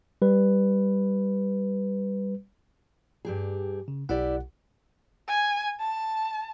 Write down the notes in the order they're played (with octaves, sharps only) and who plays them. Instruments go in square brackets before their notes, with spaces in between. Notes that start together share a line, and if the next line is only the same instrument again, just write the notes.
[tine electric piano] G3 B4
[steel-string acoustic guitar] G2 G4 G#4
[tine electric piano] C#3
[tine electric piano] B1 F#5 [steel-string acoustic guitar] E4 G4 D5
[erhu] G#5
A5